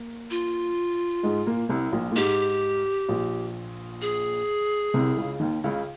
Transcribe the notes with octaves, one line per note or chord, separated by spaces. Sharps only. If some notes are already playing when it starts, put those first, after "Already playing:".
Already playing: A#3
F4
G#2 G#3
A#2 A#3
C2 C3
A#1 A#2
A#2
G#2 G4
A#1 A#2
G#4
C2 C3
C#2 C#3
D#2 D#3
C#2 C#3